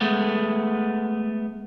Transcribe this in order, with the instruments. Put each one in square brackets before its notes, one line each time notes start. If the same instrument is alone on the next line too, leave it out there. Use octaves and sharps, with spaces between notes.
[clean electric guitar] G#3 A3 B3